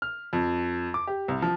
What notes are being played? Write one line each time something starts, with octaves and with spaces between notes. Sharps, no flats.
F6
F2
D6
G4
C2
F3